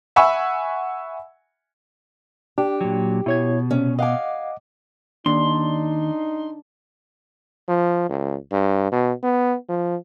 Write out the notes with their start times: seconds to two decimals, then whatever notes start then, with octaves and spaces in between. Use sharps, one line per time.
0.16 E5 F#5 G#5 B5 C#6 E6
2.58 D4 G4
2.81 A#2 F#3
3.26 B2 E4 C#5 G#6
3.71 C3 C#4
3.99 D#5 F5 F#5 G#5 D6
5.26 D#2 D4 D#4 C6
7.68 F3
8.09 C#2
8.52 G2
8.92 B2
9.23 B3
9.69 F3